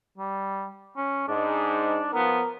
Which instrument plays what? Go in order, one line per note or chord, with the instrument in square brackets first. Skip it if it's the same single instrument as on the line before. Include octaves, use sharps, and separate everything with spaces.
[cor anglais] G3
C#4
[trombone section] G#2 [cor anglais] D4
[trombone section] F3 B3 [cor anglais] A#4